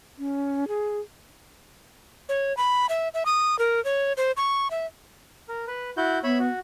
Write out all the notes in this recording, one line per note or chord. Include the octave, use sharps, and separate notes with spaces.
C#4
G#4
C#5
B5
E5
E5
D#6
A#4
C#5
C5
C#6
E5
A#4
B4
E4 F#4 G6
B3 C#5 E5 B5
F#4